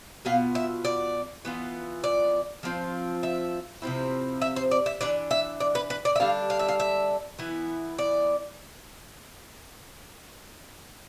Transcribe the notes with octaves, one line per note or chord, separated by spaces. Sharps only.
B2 B3 F4 F5
E5
D5
E3 B3 F4
D5
F3 A3 C4 F4
E5
C3 F3 C4 E4
E5
C5
D5
E5
E3 B3 D4 D5
E5
D5
B4
B4
D5
E5
D3 G3 D4 F5
F5
E5
F5
E5
E3 B3 E4
D5